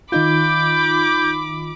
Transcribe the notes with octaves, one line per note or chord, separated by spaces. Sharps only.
D#3 D#4 F4 B5 D6 G6